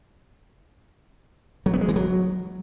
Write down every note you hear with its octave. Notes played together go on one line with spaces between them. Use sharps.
F#3
B3
G#3
E3
F#3